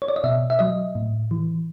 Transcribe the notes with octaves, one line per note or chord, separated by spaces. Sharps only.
C#5
D5
D#5
B2 E5
E5
F#3 D#5
A2
E3